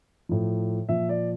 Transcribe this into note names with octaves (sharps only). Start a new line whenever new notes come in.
A2 F3
A#2 F3 E5
D5